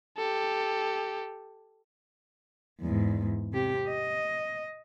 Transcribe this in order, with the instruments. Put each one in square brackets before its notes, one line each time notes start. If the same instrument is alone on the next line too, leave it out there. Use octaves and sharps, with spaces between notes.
[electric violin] G4 A4
[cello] E2 G#2
C3 G4
D#5